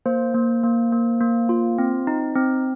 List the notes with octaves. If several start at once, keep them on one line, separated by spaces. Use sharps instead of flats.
A#3 C5
A#3
A#3
A#3
A#3
F4
C4
D#4
C4